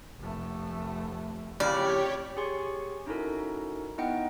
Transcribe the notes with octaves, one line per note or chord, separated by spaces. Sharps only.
F1 A3
F2 A2 C#3 G4 C#5 D5
G4 G#4 C#5 G#5 C6 C#6
C#4 D#4 E4 F#4 A4 A#4
B3 D#4 E4 D#5 F#5 G5